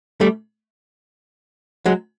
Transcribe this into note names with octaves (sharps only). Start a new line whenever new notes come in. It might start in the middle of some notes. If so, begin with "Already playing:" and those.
G3 A3
F#3 G#3